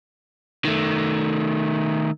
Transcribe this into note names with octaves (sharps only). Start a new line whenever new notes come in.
D#3 A3